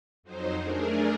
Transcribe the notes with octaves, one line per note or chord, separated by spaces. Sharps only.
F2 F#3 D#4 C5
A3 D4 G#4 A#4